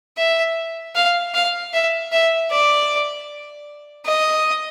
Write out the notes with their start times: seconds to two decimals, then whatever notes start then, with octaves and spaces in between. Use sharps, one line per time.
0.17 E5
0.95 F5
1.34 F5
1.73 E5
2.12 E5
2.51 D5
4.06 D#5